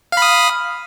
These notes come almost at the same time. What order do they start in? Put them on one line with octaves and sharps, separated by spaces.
F5 B5 D#6